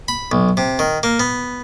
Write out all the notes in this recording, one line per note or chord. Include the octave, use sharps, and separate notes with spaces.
B5
B1
C3
D#3
A#3
B3